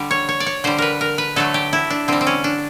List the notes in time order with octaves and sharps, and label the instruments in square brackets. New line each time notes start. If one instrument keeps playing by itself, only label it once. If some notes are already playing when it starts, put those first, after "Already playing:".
Already playing: [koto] D3 G3
C#5
C#5
D5
C#5
D3 G3 C5
A#4 B4
A#4
B4
D3 F#3 A3 A4
G4
E4
D4
D3 G3 C4
C4
C#4
D4